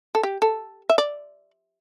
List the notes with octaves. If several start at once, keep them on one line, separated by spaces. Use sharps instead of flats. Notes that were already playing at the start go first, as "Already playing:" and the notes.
A4
G4
A4
E5
D5